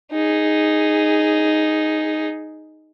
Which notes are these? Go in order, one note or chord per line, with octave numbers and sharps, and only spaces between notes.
D#4 G#4